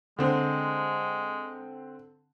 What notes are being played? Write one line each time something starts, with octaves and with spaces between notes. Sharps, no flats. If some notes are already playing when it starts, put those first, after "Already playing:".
D3 G#3 C4